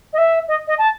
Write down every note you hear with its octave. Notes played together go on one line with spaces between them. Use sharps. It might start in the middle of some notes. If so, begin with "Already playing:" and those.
D#5
E5
D#5
D#5
A5